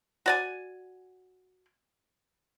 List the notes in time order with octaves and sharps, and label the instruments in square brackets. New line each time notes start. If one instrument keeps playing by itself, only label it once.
[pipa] F#4 D5 G#5